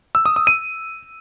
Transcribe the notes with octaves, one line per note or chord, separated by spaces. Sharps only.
E6
D#6
D#6
D#7